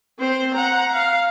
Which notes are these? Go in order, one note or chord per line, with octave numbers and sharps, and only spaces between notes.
C4 C5
F#5 A#5
F5